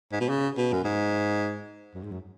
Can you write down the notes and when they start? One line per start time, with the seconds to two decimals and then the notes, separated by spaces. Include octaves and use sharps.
0.12 G#2
0.21 B2
0.29 C#3
0.57 B2
0.73 F#2
0.84 G#2
1.95 F#2
2.04 G#2
2.12 F#2